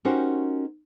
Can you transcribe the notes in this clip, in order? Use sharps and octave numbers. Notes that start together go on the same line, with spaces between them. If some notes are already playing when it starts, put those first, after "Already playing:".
C#4 D#4 F#4 G4 A#4 C5